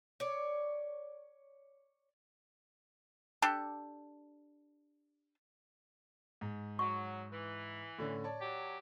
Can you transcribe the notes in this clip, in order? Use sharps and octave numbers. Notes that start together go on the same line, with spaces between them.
C#5 D5
D4 G4 A4
G#2
F#3 C#6
E3
A2 D3 C#4
C#5 D5 A5
F#3 G4